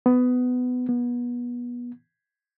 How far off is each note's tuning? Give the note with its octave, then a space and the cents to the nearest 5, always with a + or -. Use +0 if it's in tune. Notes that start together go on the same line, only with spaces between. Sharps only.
B3 +20
B3 -25